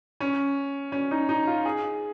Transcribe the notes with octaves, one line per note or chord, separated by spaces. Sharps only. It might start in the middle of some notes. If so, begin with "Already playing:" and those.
C#4
C#4
D#4
D#4
F4
G#4